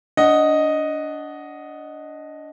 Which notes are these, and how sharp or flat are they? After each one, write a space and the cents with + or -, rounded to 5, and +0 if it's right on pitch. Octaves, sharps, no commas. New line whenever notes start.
D4 -25 D#5 +0 F#5 +0